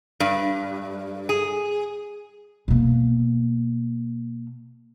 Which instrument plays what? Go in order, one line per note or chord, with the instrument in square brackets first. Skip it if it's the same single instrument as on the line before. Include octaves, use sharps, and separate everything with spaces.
[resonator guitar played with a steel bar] G2
G#4
[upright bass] B2 A#3